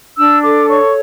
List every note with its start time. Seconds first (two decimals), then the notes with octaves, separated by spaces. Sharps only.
0.17 D4 E6
0.43 A4 D6
0.68 C#5 C#6